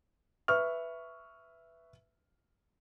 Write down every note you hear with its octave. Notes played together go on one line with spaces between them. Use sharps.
B4 E5 C#6 F6